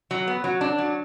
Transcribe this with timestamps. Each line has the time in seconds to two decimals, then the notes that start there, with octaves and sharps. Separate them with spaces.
0.11 F#3
0.28 B3
0.44 F#3
0.61 D4
0.78 F#3